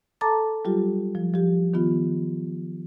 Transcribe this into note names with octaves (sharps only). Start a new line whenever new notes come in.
A4 A5 A#5 D6 A6
F#3 G3 F4 G4
F3
F3 G4
D#3 B3 F4